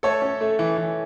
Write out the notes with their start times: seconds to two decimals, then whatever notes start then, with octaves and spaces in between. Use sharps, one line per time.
0.03 A3 A4 C#5
0.21 C#4
0.41 A3
0.59 E3
0.78 E3